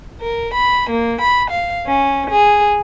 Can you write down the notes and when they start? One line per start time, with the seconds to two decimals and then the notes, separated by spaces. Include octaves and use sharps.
0.22 A#4
0.55 B5
0.90 A#3
1.21 B5
1.50 F5
1.86 C#4
2.30 G#4